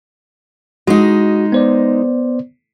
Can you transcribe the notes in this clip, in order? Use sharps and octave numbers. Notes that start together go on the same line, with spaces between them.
G#3 D#4 F#4
B3 C5 D5